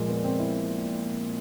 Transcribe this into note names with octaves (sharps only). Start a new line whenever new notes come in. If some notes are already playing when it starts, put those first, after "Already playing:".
Already playing: A#2 F3 G#3 A#3
B3
C4
E4